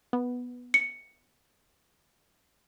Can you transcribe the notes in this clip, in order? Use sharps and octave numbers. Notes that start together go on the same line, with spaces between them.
B3
C#7